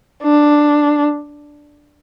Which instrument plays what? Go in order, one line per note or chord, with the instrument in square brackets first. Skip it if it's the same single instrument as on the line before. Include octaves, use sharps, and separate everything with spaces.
[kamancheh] D4